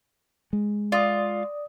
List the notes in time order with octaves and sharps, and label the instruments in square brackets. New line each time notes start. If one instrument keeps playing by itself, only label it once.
[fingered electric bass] G#3
[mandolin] F4 [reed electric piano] D5 D#6